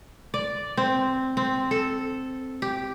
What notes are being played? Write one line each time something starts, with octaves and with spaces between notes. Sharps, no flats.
D5
C4
C4
A4
G4